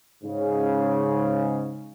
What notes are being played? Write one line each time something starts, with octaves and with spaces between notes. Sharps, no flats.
G#2 C#3